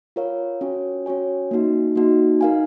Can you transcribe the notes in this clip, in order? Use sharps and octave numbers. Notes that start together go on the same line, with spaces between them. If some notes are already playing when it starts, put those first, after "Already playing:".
F4 A#4 C#5 F5
C#4 F#4 C#5 G#5
C#4 F#4 C#5 G#5
A#3 D#4 F#4
A#3 D#4 F#4
D#4 A#4 F5 G#5